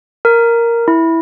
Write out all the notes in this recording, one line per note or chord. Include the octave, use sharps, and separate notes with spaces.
A#4
E4